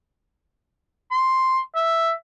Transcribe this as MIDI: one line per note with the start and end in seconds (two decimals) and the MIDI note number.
1.11 1.59 84
1.75 2.11 76